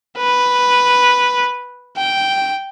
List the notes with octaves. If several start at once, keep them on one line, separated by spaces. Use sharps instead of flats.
B4
G5